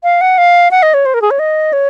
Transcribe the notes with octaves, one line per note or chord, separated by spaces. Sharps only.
F5
F#5
F5
F#5
D#5
C#5
C5
A#4
G#4
C#5
D#5
C#5